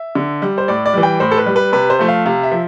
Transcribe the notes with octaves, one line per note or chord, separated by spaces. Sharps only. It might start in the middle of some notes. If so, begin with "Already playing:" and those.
Already playing: E5
D3
G3
C5
A2 D5
D5
E3 G3
G5
A2 C5
A4
B4
G3
B4
C3 B4
C5
F3 A3
F5
C3 F5
E5
F3